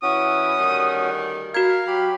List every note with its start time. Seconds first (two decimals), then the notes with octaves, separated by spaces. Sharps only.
0.03 E3 C#4 E4 F#4 D#6
0.58 D2 D#3 G3
1.54 F#4 A#4 F5 G#6
1.87 F#3 G4 B5